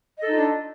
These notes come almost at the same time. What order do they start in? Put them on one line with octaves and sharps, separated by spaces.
D#5 A4 D#4 F4 D4